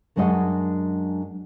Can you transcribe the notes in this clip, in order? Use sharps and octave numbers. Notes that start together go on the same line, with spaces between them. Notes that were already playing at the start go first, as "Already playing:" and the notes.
F#2 F#3 G#3 D4 D#5 F#5